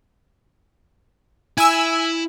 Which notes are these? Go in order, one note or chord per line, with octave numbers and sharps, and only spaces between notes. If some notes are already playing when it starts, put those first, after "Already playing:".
E4 G#5 E6